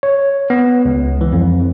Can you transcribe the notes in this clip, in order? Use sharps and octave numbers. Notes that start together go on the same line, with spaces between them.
C#5
B3
C#2
E3
F2